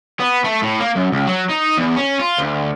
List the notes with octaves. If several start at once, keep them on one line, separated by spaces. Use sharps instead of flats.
B3
A3
A2
A#3
F#2
C#2
F#3
D#4
E2
C#4
F4
D2